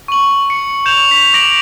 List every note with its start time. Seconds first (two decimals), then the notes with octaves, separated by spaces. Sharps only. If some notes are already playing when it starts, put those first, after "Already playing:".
0.08 C#6 F#7
0.50 C#7
0.86 G6 E7 F7
1.09 B6 F7
1.33 D6 A#6 D7 F#7